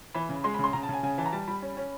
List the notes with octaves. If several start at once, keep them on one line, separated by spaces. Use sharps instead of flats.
E3 B5
C#3
G#3 C6
B5
C#3 C6
C#3 A#5
A5
C#3 G#5
C#3 G#5
E3 A5
A#5
G3 A5
G3 B5
C#4
C#4